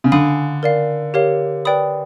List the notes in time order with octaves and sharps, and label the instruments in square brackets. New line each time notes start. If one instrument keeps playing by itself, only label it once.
[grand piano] C#3
[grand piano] D3 [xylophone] F5 G#5 B5 D#6
[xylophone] A#4 D5 F5
G4 A#4 C#5 F5
B4 D5 G5 B5 D#6